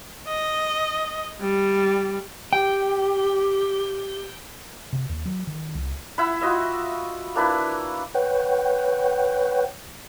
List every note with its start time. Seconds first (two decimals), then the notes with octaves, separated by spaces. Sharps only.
0.28 D#5
1.41 G3
2.53 G4 G5
4.93 C3
5.09 D#2
5.26 F#3
5.47 D#3
5.75 C2
6.18 E4 E5 F#5 B5
6.41 F4 F#4 D#5 E5
7.36 A#3 D4 E4 B4
8.14 B4 C#5 F#5 G5